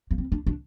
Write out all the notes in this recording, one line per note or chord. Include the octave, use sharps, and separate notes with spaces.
A#3
C4
D4
D4